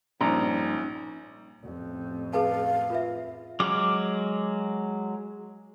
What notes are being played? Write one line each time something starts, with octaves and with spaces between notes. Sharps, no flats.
A#1 G2 C#4 D#4 A#5
A1 F2
G#4 B4 F5 A5
F4 B4 E5
F#3 G#3 D6 F6